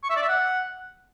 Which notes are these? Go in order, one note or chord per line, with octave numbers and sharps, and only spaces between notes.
C#6
E5
D5
E5
F#5